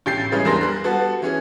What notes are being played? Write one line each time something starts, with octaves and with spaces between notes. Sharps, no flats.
A1 G4 G6 A6 C7
C#3 E3 G3 G#3 B3 C#4
E2 G3 D4 A#4 C6 A#6
G3 F#6
G3 B3 F#4 A4
E3 C#4 G#4